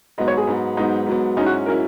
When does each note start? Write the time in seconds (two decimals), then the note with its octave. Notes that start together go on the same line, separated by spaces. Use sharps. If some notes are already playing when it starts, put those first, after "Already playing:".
0.18 G#2 F#3 B3 D#5
0.28 C#5
0.37 G#4
0.47 G#2 F#3 B3
0.77 G#2 F#3 B3 D#4
1.06 G#2 F#3 B3
1.37 G#2 F#3 C#4 D#4 E4
1.46 F#4
1.66 F#3 C#4 E4 A#4